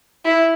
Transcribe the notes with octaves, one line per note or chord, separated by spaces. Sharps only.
E4